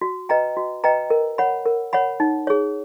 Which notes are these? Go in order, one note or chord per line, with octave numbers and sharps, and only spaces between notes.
F#4
B4 D#5 G5 A#5
F#4
B4 D#5 G5 A#5
A#4
C#5 F#5 B5
A#4
C#5 F#5 B5
D#4
G#4 C#5